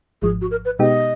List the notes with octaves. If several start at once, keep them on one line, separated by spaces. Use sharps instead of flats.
G#1 G#2 F3 G#4
F#4
A#4
B4
B2 G#3 B3 D#4 G4 D#5